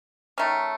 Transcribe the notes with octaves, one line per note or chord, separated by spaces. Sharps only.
D#3 A3 C#4